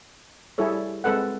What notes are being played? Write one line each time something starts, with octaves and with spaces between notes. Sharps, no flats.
G3 E4 G#4 A4 C#5
G#3 C4 A4 B4 F#5